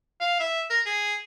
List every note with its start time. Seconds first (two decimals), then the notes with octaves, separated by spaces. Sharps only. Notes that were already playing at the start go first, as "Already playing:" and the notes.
0.21 F5
0.40 E5
0.70 A#4
0.86 G#4